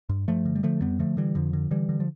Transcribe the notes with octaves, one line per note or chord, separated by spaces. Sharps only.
G2
G2 F3 A3
D3
G3
D3 F3 A3
F2 G3 B3
D3 F3 A3
D3 E3 G3
F2 D3 F3
D3
D3 E3 G3
D3
F3